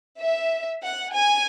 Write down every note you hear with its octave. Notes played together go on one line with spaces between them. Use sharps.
E5
F#5
G#5